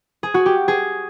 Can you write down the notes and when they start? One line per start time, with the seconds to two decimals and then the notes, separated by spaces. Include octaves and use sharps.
0.23 G#4
0.34 F#4
0.46 G4
0.68 G#4